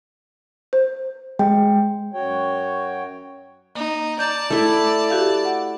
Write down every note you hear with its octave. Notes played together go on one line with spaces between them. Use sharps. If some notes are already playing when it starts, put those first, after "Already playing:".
C5
G#3 G5
F#2 F#4 C#5 G5
A#3 D#4
D5 A5 A#5 G6
A3 E4
F#4 G4 F5
F#5